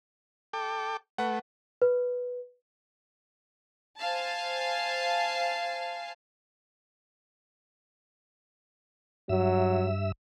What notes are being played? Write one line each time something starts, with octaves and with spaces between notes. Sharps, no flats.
A4 G5 D6
A3 B4 F#5
B4
C5 F5 G#5 A5
G2 F#3 E5 E6